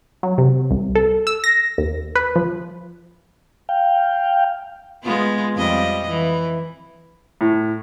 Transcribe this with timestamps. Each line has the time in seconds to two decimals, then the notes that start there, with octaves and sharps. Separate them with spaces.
0.23 F#3
0.38 C3
0.71 C2
0.95 A4
1.27 E6
1.44 A#6
1.78 D#2
2.15 B4
2.36 F3
3.69 F5 G5
5.03 G#3 B3 F4
5.55 F2 G3 D#5
6.09 E3
7.41 A2